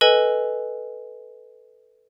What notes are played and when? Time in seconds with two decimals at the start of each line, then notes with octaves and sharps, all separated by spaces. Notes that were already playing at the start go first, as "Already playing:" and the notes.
0.01 A4 B4 D#5 G#5